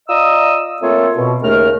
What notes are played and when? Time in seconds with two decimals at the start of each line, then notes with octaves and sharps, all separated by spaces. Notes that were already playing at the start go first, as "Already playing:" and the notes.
0.09 F4 D5 D#5 A#5 D#6 E6
0.82 A3 A#3 C4 F4 A4 C#5
1.17 B2
1.42 D#2 C#3 A3 A#4 F6